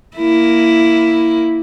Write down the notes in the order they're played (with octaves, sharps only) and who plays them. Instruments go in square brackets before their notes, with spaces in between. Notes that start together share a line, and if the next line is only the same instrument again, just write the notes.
[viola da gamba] A#3 E4